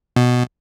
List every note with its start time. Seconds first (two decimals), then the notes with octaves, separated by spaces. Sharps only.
0.16 B2